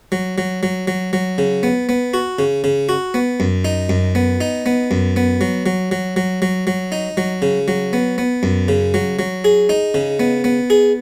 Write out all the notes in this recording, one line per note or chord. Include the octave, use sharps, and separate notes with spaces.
F#3
F#3
F#3
F#3
F#3
C#3
B3
B3
F#4
C#3
C#3
F#4
B3
F#2
D#4
F#2
B3
D#4
B3
F#2
B3
F#3
F#3
F#3
F#3
F#3
F#3
D#4
F#3
C#3
F#3
B3
B3
F#2
C#3
F#3
F#3
G#4
D#4
C#3
B3
B3
G#4